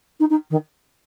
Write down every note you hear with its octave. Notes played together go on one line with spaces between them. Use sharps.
D#4
D#4
D#3